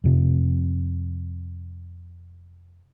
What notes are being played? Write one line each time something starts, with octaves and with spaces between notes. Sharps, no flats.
F2 C3